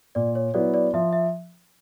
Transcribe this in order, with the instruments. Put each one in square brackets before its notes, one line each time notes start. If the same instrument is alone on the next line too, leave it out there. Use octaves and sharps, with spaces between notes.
[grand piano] A#2 [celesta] D5
[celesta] C#5
[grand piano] F#3 B3 E4 [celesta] D5
[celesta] D5
[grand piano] F3 [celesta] E5
[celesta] E5